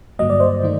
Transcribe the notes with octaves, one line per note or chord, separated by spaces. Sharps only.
G2 D3 F#3 A#3 D#5
D5
C5 D#5
D#3 A3 D#4